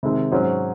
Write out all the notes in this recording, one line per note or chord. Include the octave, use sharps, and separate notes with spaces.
C3 D#3 G#3
G#2 F#3 C#4 G#4 C5